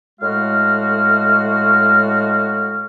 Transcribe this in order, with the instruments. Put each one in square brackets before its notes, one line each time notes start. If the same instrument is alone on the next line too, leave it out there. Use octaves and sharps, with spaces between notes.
[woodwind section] A2 G#3 F#4 F5 F6